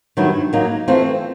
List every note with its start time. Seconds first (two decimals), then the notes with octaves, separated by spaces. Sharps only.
0.17 G2 D#3 F#3 B3 E4
0.53 F#3 A#3 D#4
0.88 E3 A3 C4 F4